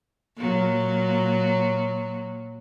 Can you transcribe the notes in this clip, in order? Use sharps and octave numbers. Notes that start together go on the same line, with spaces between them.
A#2 F#3